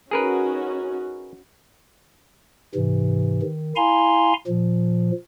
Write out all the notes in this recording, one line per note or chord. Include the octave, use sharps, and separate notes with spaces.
C#4 D#4 F#4 G#4 A#4 B4
G#2 C3 E3
D#3
E4 F5 G#5 A#5 C6
A#2 F3